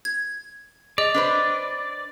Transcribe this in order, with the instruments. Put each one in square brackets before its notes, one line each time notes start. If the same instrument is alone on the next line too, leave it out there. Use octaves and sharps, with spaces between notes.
[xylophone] G#6
[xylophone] G#4 D#5 [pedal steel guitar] D5
[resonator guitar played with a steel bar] D4 B4 C5